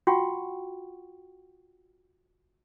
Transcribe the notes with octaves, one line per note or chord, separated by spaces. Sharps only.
F4 F#4 F#5 G5 C#6